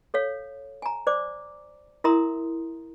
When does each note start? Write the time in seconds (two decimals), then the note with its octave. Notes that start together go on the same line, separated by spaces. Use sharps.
0.14 A4 C#5 F5
0.82 G#5 A#5
1.07 C5 D5 D6
2.04 E4 A#4 E5 A#5 C6 D#6